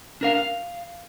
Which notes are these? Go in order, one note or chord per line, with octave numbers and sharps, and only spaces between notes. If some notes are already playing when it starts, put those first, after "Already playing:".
D4 A#4 F5
F5